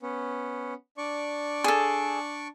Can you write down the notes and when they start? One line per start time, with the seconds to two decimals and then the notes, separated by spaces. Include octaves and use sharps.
0.02 B3 C#4
0.97 D4 D5 C#6
1.64 G#4 A4